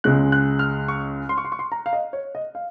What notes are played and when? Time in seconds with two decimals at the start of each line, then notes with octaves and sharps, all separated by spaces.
0.04 C#2 C#3 G#3 C#4 F#6
0.32 F#6
0.59 F6
0.88 C#6
1.29 C6
1.38 C#6
1.45 C6
1.52 C#6
1.59 C6
1.72 A#5
1.86 F5
1.93 D#5
2.13 C#5
2.35 D#5
2.55 F5